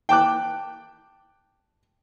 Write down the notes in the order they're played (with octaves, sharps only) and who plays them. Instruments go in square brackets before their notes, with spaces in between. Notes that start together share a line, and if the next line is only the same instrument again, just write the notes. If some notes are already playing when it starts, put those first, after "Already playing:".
[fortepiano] G5 A5 D6 F#6